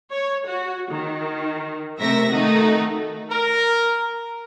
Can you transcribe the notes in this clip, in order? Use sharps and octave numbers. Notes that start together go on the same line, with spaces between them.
C#5
F#4
D#3
C3 A3 A#4 E5 A#6
D#3 A3 D#4 F#4
A#4